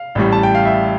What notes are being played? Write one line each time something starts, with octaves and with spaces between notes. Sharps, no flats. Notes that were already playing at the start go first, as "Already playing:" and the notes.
Already playing: F5
A1 A2 G3
A5
G5
F5
E5